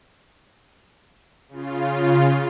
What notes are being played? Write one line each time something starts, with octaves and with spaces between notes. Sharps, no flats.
C#3 F4